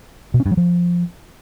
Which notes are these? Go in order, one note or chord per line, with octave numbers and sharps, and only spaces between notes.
B2
C#4
G2
F#3
F3